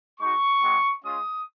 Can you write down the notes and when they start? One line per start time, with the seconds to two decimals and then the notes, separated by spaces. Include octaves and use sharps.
0.19 G#3 D#4 F#4 C#6
0.61 G#3 C4 F#4
1.04 G#3 C#4 F4 D#6